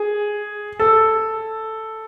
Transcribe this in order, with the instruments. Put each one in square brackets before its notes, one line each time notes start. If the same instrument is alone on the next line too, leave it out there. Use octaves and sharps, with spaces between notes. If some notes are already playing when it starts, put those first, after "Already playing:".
Already playing: [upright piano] G#4
A4